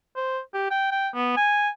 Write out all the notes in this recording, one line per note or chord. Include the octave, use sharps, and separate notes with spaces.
C5
G4
G5
G5
B3
G#5